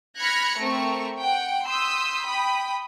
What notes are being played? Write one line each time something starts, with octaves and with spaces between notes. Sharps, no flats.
B5 F6 F#6 G#6 A#6 C#7
A3 C4 A#4 C#6
F#5 G5
C6 D#6 E6 G6 B6
G5 B5 D#6